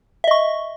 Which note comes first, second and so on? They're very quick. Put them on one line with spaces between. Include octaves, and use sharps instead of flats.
E5 D#5 C#6